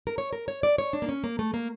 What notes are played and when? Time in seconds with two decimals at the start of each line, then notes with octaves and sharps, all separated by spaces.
0.07 A#4
0.18 C#5
0.33 A#4
0.48 C#5
0.63 D5
0.78 C#5
0.93 D4
1.02 A#3
1.09 C#4
1.24 A#3
1.39 A3
1.54 A#3